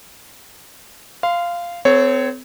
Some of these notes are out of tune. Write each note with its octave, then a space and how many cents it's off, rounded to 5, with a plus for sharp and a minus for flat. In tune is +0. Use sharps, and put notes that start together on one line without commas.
F5 -10 C6 -25
C4 -35 A4 +0 C#5 +0